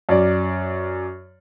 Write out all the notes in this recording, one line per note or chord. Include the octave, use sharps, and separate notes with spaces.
F#2 D5